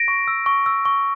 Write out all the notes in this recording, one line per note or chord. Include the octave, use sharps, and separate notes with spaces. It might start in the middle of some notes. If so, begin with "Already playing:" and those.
Already playing: A#6 D7
C#6
E6
C#6
E6
C#6